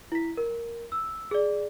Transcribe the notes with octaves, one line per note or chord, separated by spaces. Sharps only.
E4 B6
A#4
E6
G#4 D5